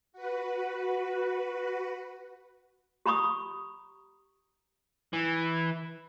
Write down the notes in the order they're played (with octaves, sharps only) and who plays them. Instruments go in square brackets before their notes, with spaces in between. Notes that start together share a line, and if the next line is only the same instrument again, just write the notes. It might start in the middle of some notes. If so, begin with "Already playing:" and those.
[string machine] F#4 B4
[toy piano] G4 A#5 B5 C#6 D#6
[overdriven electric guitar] E3